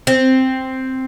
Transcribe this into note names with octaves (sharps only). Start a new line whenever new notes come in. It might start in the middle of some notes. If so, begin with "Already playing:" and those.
C4